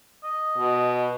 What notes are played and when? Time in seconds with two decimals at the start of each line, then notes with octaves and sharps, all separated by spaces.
0.24 D#5
0.57 B2